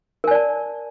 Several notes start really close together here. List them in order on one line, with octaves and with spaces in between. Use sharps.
A#4 G#5 D5 A5